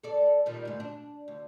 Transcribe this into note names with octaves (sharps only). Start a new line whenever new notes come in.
A4 D5
A#2 D#3 G3
D2 G#2
D4
D2